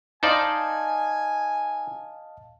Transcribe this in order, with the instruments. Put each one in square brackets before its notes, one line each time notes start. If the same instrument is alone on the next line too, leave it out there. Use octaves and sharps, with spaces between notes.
[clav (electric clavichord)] D#4 C5 D5 [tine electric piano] D#5 F5 A5 [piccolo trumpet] G#5